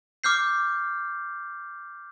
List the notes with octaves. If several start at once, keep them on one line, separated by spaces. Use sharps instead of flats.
D6 F6 G6 C7